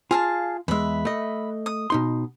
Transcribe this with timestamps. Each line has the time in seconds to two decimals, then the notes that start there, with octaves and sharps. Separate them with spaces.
0.11 F4 G#4 F5 A5
0.68 E2 G#3 B4 E5
1.05 A3 D#5
1.66 D#6
1.90 B2 D#4 C6